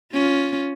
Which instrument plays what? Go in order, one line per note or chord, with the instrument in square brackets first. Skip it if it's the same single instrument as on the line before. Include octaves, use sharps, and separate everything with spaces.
[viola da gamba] C#4 F4